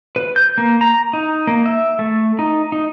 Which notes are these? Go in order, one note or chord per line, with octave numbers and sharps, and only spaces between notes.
B4
G6
A#3
A#5
D#4
A#3
E5
A3
D#4
D#4